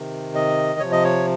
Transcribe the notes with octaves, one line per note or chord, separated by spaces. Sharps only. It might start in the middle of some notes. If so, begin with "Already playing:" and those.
Already playing: C3 D#3
D#5
C3 F3 C#5
D#5
C#5